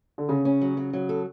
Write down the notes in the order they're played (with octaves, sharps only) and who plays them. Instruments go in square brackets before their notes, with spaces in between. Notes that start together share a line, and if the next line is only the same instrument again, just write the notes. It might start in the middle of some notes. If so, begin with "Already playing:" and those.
[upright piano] D3
[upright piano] C#3 [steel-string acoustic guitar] C#4
[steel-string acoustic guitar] C#4
F#3
F#3
F#3
A4